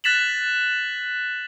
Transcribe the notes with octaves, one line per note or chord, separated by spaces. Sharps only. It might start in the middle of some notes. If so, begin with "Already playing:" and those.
F#6 A6 B6 E7 F#7